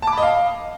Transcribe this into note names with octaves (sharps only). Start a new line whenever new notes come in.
A5
D6
B5
D#5
F5